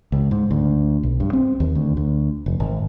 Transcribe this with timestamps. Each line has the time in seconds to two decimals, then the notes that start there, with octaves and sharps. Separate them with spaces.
0.12 C#2
0.31 G#2
0.51 D2
1.03 B1
1.20 G2
1.33 C4
1.60 D#2
1.75 D2
1.97 D2
2.46 F1
2.60 G#1